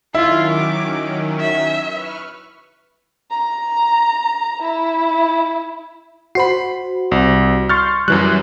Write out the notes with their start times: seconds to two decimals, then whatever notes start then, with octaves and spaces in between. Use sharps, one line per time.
0.14 D#3 F#3 C#4 E4 F4
0.52 D6
1.40 E5
1.88 B4 C#6 F6
3.30 A#5
4.62 E4
6.35 F#4 C5 B5 C7
7.11 C2
7.69 C6 C#6 F6 G6 A6
8.08 F#2 E3 G3 F#6